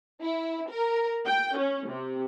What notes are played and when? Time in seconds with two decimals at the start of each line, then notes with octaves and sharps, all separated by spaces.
0.22 E4
0.70 A#4
1.26 G5
1.57 C#4
1.88 C3